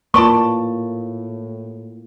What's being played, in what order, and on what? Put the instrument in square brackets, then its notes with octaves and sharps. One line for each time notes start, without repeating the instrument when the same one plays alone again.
[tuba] A2 [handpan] A#3 F4 [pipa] B4 D5 A5 [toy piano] C#6